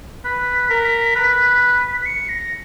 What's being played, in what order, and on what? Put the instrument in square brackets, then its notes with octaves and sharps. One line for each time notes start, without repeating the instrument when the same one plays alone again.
[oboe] B4 [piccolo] B6
[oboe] A#4
B4
[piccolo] B6
C#7
A#6